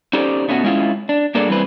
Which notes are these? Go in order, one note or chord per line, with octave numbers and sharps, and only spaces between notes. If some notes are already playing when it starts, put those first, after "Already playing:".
C#4 D#4 G4 A4 C5 D5
B2 A3 B3 C#4 F4 F#4
G#3 C#4 E4 F4
D4
G2 A#3 D4 G#4 A4 D5
E3 G3 C4 G#4 B4